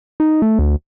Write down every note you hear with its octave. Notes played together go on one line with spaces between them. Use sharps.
D#4
A3
D2